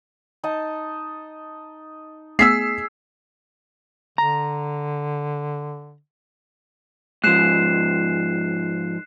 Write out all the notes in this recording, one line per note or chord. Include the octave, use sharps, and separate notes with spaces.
D#4 D#5 A5
A3 B3 G#4 E6 B6 C7
D3 A#5
G#2 F3 F#6 C7 E7